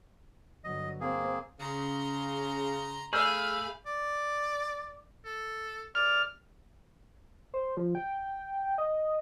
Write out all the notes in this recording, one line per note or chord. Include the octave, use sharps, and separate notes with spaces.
G1 F#3 D#5
A#3 C4 G#4
C#3 A#5 C6
A3 G#4 F5 B5 E6 F6 G6
D5
A4
D5 F6
C5
F3
G5
D#5